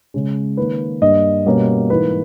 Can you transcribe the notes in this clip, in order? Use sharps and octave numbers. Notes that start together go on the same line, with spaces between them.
C#3 G#3 C#4
D#3 A#3 C#4 B4
G2 G3 A#3 D#5
B2 G3 A#3 C#4
G#2 E3 A#3 B4